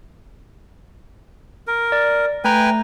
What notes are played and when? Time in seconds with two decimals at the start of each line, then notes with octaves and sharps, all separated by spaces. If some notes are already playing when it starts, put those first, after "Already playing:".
1.67 A#4
1.92 D5
2.44 A3 B4 G5 G#5 A#5